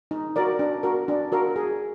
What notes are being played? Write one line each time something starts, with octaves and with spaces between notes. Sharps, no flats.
D#4
F#4 A#4 D5
D4
F#4 A#4
D4
F#4 A#4
G#4